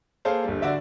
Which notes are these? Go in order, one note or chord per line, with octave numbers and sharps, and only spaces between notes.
A#3 G#4 A4 C5 F5
G1 G3
D3 F#4 D5 E5